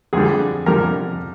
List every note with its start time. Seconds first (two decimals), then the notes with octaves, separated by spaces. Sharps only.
0.13 F2 D3 G3 G#4
0.66 F2 D3 G3 A#4